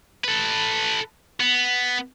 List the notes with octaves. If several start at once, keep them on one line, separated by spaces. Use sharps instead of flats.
A4 B4
B3